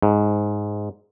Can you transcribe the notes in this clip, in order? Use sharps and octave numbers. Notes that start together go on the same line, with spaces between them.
G#2